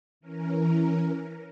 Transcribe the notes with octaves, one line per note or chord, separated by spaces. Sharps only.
E3 C#4 A#4